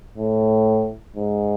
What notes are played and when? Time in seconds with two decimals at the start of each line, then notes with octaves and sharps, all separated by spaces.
0.18 A2
1.17 G#2